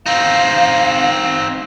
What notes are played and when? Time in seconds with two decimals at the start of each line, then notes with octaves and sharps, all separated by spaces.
0.06 C4 D#4 F5